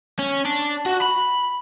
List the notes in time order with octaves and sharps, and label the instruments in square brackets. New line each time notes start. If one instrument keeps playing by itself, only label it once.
[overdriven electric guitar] C#4
D4
F#4
B5